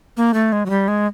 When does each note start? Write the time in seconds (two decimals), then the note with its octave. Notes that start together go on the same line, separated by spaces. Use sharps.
0.17 A#3
0.34 A3
0.52 G#3
0.66 F#3
0.70 G3
0.88 G#3